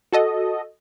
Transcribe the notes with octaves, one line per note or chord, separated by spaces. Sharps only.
F#4 A4 D#5